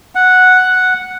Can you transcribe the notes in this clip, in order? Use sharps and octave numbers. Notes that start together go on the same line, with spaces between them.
F#5